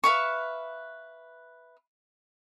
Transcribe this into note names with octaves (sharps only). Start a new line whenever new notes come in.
B4 E5 F5 C#6